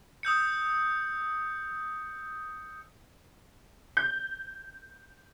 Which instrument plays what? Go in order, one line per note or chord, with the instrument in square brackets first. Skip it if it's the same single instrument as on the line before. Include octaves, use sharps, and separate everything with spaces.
[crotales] D#6 E6 G6 C#7
[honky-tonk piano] G6